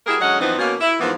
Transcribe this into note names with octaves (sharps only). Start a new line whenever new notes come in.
G3 E4 F#4 G#4 A#4
D3 F#3 G#3 C#4 D#5 F#5
F#2 E3 F3 B3 C4 D#4
B2 A#3 C#4
E4
G#2 E3 F3 A#3 B3